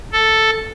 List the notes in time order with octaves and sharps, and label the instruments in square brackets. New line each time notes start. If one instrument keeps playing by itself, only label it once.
[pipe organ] A4